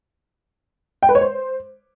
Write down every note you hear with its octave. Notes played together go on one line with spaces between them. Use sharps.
G5
B4
C#5
C5